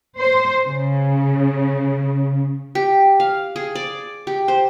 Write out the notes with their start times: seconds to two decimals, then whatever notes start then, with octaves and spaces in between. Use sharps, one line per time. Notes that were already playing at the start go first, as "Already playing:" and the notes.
0.19 C5
0.66 C#3
2.75 G4
3.20 F5
3.56 G#4
3.75 D5
4.27 G4
4.48 C5